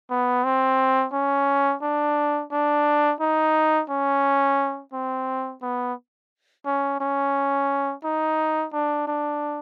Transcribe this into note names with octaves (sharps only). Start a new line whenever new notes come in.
B3
C4
C#4
D4
D4
D#4
C#4
C4
B3
C#4
C#4
D#4
D4
D4